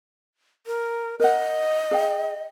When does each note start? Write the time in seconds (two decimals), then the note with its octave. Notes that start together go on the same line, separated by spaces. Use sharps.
0.67 A#4
1.20 A#4 D#5 F#5
1.91 G#4 F5 G5